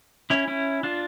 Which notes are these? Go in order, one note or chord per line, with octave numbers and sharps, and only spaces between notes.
C#4 E4
C#4 E4
D4 F4